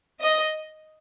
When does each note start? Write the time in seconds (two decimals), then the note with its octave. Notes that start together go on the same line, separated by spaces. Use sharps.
0.20 D#5